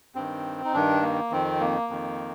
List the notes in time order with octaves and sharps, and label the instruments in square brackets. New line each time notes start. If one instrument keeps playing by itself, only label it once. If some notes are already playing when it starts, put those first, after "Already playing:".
[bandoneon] G2 D#3 C4
D#4
G2 D#3 D4
A#3
F2 D#3 C4
A#3
F2 D#3